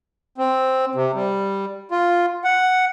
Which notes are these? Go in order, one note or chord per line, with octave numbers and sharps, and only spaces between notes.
C4
C3
G3
F4
F#5